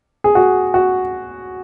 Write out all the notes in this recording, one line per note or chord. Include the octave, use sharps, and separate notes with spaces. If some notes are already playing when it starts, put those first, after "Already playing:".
G#4
F#4
F#4